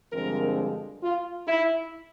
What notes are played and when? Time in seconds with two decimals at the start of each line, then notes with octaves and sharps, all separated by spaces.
0.11 G2 D3 F3 G#3 C4 A#4
1.02 F4
1.47 E4